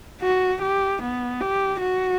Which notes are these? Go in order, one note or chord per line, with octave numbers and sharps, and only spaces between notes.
F#4
G4
B3
G4
F#4